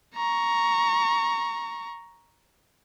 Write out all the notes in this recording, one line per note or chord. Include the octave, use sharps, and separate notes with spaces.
A#5 C#6